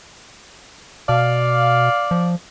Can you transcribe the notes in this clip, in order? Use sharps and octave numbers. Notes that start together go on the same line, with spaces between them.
B2 D5 F5
F3